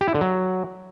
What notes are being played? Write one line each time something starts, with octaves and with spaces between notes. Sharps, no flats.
G4
E4
D3
F#3